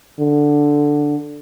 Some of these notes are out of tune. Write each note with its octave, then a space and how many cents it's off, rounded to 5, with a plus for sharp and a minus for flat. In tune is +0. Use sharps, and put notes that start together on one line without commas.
D3 +0